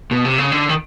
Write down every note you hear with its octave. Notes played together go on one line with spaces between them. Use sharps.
B2
C3
C#3
D3
D#3